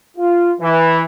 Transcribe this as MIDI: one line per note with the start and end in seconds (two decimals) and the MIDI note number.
0.17 0.52 65
0.60 1.02 52